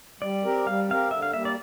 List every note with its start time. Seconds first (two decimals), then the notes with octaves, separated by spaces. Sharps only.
0.21 G3 D5
0.44 C4 G4 A#4
0.67 G3 F5
0.88 C4 G4 A#4 F5
1.11 D3 E5
1.22 F5
1.33 G3 A#3 E5
1.45 D5